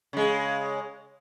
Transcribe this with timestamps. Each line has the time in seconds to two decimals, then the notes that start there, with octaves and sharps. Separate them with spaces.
0.13 C#3 G#3